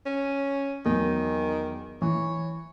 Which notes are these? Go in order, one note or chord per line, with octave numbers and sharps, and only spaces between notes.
C#4
E2 D#3 F#3
E3 C#5